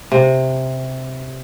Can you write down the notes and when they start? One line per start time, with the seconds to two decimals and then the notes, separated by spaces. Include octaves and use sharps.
0.12 C3